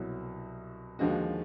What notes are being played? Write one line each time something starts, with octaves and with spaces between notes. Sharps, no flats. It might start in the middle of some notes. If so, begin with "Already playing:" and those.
Already playing: C2 B2 F#3 E4
D#2 D3 F3 G#3 F#4